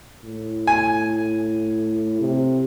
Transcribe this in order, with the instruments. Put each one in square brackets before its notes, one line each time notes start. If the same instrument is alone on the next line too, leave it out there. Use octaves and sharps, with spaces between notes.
[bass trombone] A2
[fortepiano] G#5
[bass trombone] C3